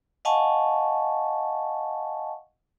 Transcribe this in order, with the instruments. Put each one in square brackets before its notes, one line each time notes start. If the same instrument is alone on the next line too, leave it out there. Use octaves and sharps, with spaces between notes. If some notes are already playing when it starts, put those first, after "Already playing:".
[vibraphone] D#5 F5 F#5 G#5 A5 C#6